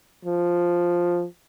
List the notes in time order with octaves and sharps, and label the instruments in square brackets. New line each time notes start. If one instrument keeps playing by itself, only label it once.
[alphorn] F3